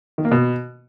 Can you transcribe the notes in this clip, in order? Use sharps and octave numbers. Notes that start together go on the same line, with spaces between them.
D#3
A#3
B2